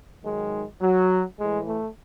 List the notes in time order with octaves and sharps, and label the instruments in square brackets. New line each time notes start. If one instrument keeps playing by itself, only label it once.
[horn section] G#2 D#3 F#3 G#3
F#3
A2 E3 G#3
A3